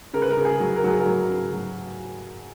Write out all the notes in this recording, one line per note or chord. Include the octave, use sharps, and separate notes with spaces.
C#3 A#4
B4
A#4
C#3
G#4
F#3
A#4
F#3 G#4
A#4
F#3
C#3
F#3